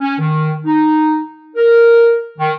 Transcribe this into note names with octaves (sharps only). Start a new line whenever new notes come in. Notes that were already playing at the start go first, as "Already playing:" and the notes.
C#4
D#3
D#4
A#4
D#3